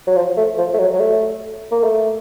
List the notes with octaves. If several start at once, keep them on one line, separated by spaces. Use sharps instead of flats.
F#3
F3
A3
F3
A3
F#3
F#3
A3
A#3
A3